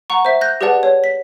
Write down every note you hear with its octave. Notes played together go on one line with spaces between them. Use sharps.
F#5 A#5 C#6
C5 E5
F#6 G6 A#6
G4 G#4 B4 D5 F#5 A5
C#5
B6